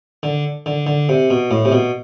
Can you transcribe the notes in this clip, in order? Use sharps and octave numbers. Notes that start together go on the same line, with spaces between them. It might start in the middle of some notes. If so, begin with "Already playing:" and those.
D3
D3
D3
C3
B2
A2
C3
B2